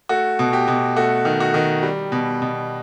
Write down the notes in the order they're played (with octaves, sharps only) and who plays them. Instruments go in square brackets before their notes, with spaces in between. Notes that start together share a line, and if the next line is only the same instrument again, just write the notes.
[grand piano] A3 F#4
B2
G4
B2
A3 F#4
D#3
F#4
D#3
G3
B2
B2